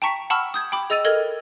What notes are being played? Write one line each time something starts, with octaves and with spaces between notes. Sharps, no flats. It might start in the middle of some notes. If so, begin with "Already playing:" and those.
G5 A5 A#5 C#6 B6 C#7
F#5 A5 B5 C#6 E6 F6
D#6 G6 G#6
G5 B5 D6
G#4 D#5 E6 A6 D#7 F7
A4 A#4 D#5 F6 G#6